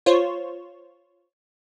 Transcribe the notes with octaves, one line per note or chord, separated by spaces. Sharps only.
F4 C5 C#5